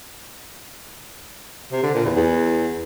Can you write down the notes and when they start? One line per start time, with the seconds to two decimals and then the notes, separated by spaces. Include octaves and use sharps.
1.72 C3
1.83 D3
1.94 A#2
2.05 E2
2.16 E2